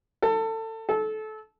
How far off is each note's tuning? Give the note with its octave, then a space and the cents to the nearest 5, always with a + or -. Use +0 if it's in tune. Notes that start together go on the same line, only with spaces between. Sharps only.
A4 +25
A4 -25